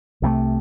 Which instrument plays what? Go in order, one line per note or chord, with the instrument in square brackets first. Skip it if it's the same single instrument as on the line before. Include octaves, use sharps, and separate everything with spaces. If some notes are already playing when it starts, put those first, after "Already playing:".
[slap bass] C2 C3 F3 A3